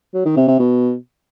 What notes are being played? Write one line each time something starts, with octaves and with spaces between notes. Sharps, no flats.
F#3
D#3
C3
C3
B2